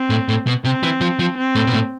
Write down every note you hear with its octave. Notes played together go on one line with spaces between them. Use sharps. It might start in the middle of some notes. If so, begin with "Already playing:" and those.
Already playing: C4
A2
A2
B2
C3 C4
E3
F3
F3
C4
A2
B2
A2